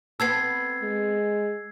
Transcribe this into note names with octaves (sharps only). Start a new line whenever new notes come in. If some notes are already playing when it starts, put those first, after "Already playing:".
B3 C4 A4 E6 G#6 C7
G#3